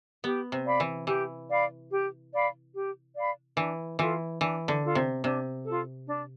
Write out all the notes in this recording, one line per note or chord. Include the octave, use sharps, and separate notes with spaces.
B3 G4
C3
D5 F5 B5
E3
E3 G4
D5 F5 B5
G4
D5 F5 B5
G4
D5 F5 B5
E3 D4
E3 F4 A4
E3 D4
D3
F4 A4
C3
C3 D4
F4 A4
D4